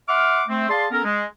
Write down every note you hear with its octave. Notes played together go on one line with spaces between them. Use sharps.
E5 F#5 C6 D6 F6
A3 C4
G#4 D5 F5 A5 C6
B3 C#4 A4 A#4
G#3